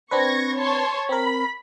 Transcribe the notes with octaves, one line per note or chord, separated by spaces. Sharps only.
C4 D4 B4 C#6 G#6 A#6
C#5 A5 C6
C4 A#4 B5